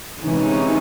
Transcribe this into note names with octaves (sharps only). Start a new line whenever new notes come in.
C3 E3 G#3 C#4 D#4